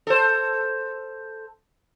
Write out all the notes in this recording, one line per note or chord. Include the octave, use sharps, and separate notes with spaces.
A4 C5